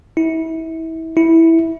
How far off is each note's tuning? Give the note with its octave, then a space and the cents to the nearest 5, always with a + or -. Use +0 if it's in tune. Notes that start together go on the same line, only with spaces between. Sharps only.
E4 -30
E4 -10